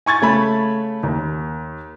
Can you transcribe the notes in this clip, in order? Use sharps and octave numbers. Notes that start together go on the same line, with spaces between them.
G#5 C#6 G#6 A6
C#3 A3 B5
D#2